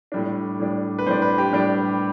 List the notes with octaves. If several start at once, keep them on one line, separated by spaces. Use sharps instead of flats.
A2 G3 D4
A2 G3 D4
B4
A2 G3 D4 C5
B4
G4
A2 G3 D4 G4